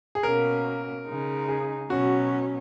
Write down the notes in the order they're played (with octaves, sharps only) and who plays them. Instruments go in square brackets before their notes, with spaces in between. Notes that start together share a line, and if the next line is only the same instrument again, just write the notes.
[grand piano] G#4
[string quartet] B2 A#3 C#4 [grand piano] A#4
[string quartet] C#3 G#3 D#4
[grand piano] G#4
[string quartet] B2 F#3 C#4 [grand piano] F#4